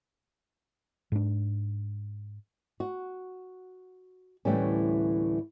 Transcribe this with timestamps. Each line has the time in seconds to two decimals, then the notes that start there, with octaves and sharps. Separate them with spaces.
1.12 G#2 D4
2.80 F#4
4.45 D2 A2 E3 G3 C#4